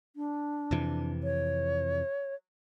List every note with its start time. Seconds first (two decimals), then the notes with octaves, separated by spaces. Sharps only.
0.16 D4
0.71 F2 C3 E3
1.23 C#5